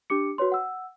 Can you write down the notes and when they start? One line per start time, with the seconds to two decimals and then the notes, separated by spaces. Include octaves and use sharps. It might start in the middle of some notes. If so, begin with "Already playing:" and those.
0.10 D4 G4 D6 C#7
0.38 F#4 B4 C#5 C6
0.52 F#5 E6